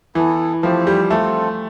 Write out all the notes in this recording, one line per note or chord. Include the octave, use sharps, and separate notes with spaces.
E3 B3 E4 A4
F3 A3 C4 E4 G4
G3
A3 C4 F4 A4